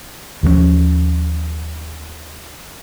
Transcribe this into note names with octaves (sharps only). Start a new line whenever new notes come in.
D#2 F3 A3 C#4